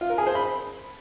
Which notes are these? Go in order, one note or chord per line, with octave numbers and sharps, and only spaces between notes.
F4
A#4
G#4
C5
B5